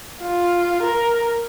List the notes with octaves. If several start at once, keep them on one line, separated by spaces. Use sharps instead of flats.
F4
A#4